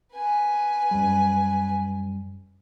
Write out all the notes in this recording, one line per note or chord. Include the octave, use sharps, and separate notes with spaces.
B4 G#5
F#2 G3